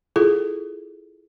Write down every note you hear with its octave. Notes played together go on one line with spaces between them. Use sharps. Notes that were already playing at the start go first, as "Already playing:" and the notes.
E4 F4 G#4 A4